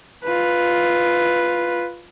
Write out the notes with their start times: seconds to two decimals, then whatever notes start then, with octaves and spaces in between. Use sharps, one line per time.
0.25 F4 B4